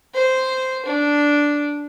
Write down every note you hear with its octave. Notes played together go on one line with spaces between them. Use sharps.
C5
D4